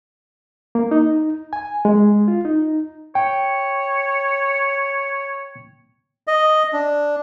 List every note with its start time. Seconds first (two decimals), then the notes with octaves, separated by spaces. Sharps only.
0.75 A#3
0.91 D#4
1.53 G#5
1.85 G#3
2.28 F4
2.45 D#4
3.15 C#5 G5
6.27 D#5
6.73 D4